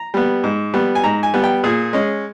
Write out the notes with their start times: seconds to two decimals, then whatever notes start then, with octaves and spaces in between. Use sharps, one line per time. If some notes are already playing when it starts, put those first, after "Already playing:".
Already playing: A#5
0.14 G3 B3
0.44 G#2
0.74 G3 B3
0.95 G#5
1.04 G#2 A#5
1.23 G#5
1.34 G3 B3
1.44 G5
1.64 A#2 G#4
1.93 G#3 C#4